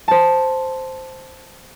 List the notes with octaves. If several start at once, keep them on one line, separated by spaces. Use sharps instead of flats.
C5 A5